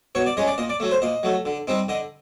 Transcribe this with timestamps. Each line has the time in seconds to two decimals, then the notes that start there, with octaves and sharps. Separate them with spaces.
0.15 B2 C#5
0.26 D5
0.37 G#3 C#4 D#5
0.47 D5
0.58 A#2 D#5
0.69 D5
0.80 F#3 A3
0.91 C5
1.02 A#2 D#5
1.23 F#3 A3
1.45 D3
1.67 G3 C4 D#4
1.88 D3 D#5